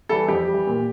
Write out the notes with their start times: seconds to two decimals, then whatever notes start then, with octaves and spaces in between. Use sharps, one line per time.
0.09 E3 G3 A4
0.28 F2 G4
0.48 G3
0.53 E3
0.67 A#2